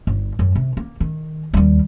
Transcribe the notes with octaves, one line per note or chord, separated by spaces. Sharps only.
G1
F#2
C3
A#3
D#3
D#2 G3